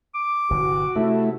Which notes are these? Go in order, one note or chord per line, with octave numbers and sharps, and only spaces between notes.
D6
G1 C3 E3 F#4
C3 A3 E4